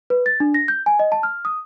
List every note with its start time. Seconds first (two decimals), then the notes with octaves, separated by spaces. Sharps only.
0.10 B4
0.26 A6
0.40 D4
0.54 A#6
0.68 G6
0.86 G#5
0.99 D#5
1.12 A5
1.23 F6
1.45 D#6